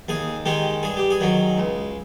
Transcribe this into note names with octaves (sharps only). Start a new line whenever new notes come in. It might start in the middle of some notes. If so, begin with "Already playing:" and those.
D#2 G#4
D#3 G#3 G4
G2 G#4
G4
G#4
D#3 F#3
C#2